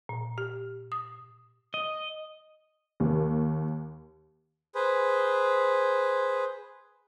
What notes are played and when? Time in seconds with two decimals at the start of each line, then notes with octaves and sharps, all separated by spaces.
0.09 A#2
0.38 G4
0.92 D#6
1.74 D#5
3.00 D#2
4.75 G#4 B4 C5